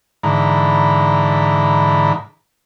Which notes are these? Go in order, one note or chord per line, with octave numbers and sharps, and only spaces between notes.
G#2 D3 E3 A#5 B5